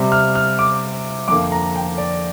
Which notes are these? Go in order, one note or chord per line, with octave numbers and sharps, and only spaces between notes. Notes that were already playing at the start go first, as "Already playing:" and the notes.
Already playing: C3 G3 C4
F6
F6
D6
F2 D3 A#3 D6
A#5
G5
D5